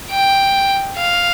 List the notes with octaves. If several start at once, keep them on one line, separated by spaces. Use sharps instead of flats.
G5
F5